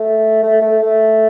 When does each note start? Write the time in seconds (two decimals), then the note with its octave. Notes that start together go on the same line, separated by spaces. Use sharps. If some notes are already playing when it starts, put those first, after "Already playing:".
Already playing: A3
0.43 A3
0.62 A3
0.82 A3